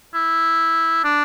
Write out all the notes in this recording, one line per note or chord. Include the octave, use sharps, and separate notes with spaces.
E4
D4